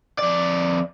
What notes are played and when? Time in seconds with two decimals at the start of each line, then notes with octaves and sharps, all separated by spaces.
0.19 F2 D5